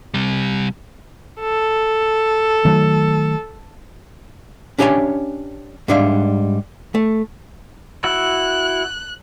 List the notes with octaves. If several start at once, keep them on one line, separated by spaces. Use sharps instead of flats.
C3 G3
A4
D#3 F#3 A3
C#4 D4 G4 C#5 E5 G#5
G#2 G3 D4 E5 F5
A3
E4 F#4 E6 F#6